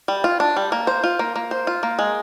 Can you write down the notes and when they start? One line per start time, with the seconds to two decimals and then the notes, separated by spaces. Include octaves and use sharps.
0.08 G3
0.24 F4
0.40 D4
0.57 G3
0.72 A#3
0.87 C5
1.04 F4
1.19 A#3
1.36 A#3
1.51 C5
1.67 F4
1.83 A#3
1.99 G#3